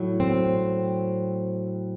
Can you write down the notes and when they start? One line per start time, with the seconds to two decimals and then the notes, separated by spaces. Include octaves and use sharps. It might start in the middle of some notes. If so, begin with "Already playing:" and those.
Already playing: A2 F#3
0.20 C4